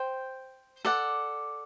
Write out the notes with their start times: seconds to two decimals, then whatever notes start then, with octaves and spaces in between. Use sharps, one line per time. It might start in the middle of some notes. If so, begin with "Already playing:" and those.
Already playing: C5 G5
0.85 A4 D5 F#5